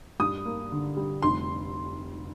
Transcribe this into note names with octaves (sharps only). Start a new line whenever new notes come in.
G2 D#6
A#3
D3
G3
F1 C6